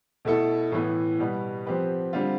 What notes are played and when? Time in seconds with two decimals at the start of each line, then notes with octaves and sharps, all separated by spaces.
0.25 B2 A3 E4 A4
0.72 A2 E3 B3
1.19 B2 G3 B3
1.66 F3 C4 G4 B4
2.13 D3 G3 C4 F4